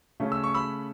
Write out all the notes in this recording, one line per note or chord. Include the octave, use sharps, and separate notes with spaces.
C#3 A3 C#4
E6
C#6
B5 E6